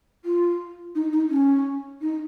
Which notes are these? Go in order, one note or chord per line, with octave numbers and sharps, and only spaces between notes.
F4
D#4
D#4
C#4
D#4